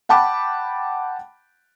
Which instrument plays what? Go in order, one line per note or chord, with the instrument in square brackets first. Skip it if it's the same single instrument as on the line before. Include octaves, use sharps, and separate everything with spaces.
[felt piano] F#5 G5 A5 B5 D6